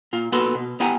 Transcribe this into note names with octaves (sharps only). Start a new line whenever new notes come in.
A#2 F4
A#2 B3 F#4 A4 B4 C6
B2
B3 E4 G4 F#5 G#5 A#5